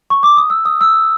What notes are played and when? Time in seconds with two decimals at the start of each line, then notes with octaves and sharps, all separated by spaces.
0.10 C#6
0.23 D6
0.37 D#6
0.50 E6
0.65 D#6
0.81 E6